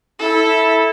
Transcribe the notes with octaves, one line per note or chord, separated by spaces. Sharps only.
E4 A4